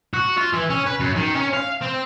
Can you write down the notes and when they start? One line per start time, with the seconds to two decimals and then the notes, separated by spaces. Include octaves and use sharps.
0.14 F#4
0.38 F4
0.54 E3
0.70 C#4
0.86 B4
1.00 F#2
1.16 D#3
1.35 C#4
1.53 F5
1.81 C4